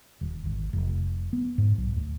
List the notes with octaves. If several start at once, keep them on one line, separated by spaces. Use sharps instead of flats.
D#1
G#1
F1
B3
G#2
B1
D2